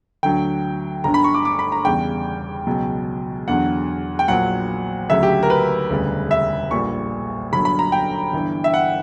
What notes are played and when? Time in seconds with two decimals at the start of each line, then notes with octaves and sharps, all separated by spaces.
0.23 D2 D3 F#3 G5
1.04 G1 G2 D3 A#5
1.14 B5
1.24 C#6
1.34 D6
1.45 D6
1.59 B5
1.72 A#5
1.85 E2 C#3 G3 G5
2.67 C#2 B2 F#3
3.48 E2 D3 F#3 F#5
4.19 G5
4.28 A#1 A#2 F#3 F#5
5.10 D2 C#3 F#3 E5
5.23 G4
5.43 A#4
5.50 B4
5.90 E1 D2 C#3 G3
6.31 E5
6.71 A#1 A#2 G3 C#6
7.53 G1 G2 F#3 B5
7.65 B5
7.79 A#5
7.92 G5
8.33 G1 G2 E3
8.64 E5
8.74 F#5